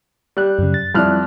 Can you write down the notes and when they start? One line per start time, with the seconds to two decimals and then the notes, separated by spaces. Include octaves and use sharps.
0.37 G3 F#6
0.59 F#2 C#3
0.74 A6
0.95 F2 G3 E4 D5 F6 F#6